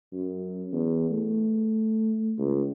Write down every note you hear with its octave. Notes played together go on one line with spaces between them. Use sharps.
F#2
E2
A3
C#2